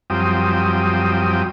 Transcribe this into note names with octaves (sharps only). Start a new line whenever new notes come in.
F#2 F3 G3 C4 G5 D#6